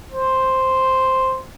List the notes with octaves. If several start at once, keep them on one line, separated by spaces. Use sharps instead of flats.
C5